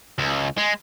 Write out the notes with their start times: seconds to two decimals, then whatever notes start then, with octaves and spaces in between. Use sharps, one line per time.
0.18 C#2
0.57 G#3